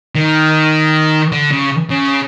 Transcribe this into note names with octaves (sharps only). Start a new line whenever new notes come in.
D#3
D3
C#3
C#3